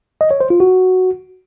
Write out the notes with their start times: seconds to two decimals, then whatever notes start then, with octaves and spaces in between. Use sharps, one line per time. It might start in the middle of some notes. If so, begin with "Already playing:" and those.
0.21 D#5
0.31 C#5
0.40 C5
0.50 F4
0.60 F#4